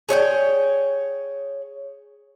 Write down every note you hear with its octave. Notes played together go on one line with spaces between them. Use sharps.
G#4 C#5 D#5 G5